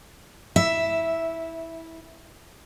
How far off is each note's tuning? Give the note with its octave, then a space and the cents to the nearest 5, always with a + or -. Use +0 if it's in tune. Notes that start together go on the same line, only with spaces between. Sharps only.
E4 -15 E5 +0